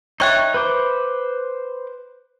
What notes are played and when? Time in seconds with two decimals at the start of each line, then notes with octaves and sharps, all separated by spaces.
0.20 D#4 C#5 E5 G5 C#6 F#6
0.54 B4 C5 D6